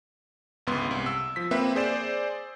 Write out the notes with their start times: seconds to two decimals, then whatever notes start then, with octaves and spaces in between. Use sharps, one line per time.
0.67 G1 C#2 B3 C6
0.91 C2
1.06 E6
1.36 F3 B6
1.51 A#3 C4 B4 E5
1.75 G#4 C5 D5 E7